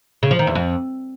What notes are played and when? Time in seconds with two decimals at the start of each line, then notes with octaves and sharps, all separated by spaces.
0.23 C#3
0.31 F3
0.39 D#3
0.47 E2
0.55 F2